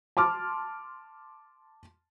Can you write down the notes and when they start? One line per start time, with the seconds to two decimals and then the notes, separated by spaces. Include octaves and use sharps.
0.17 A5 C6 D6 F6